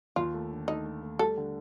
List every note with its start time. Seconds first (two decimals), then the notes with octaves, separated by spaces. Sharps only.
0.16 D#2 F4
0.34 A3
0.51 D3
0.68 A3 D#4
0.86 A3
1.03 A3
1.19 G3 A4
1.37 D3